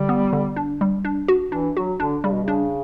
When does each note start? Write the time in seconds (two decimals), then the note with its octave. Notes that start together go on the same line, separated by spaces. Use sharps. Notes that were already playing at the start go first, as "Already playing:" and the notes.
Already playing: D3 G3
0.09 B3
0.33 D3
0.56 D4
0.81 G3
1.05 D4
1.28 F#4
1.52 E3 D4
1.77 F#3 F#4
1.99 D3 D4
2.24 C#3 G3
2.33 B2
2.43 C#3 D4